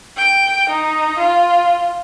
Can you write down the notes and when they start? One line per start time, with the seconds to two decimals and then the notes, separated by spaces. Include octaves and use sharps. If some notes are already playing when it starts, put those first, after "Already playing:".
0.17 G5
0.70 D#4
1.19 F4